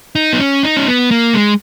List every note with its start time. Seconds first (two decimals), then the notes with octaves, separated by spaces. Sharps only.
0.15 D#4
0.33 B3
0.40 C#4
0.63 D#4
0.77 C#4
0.88 B3
1.11 A#3
1.34 G#3